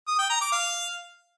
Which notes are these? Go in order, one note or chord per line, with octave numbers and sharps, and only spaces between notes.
D#6
G5
A#5
D6
F5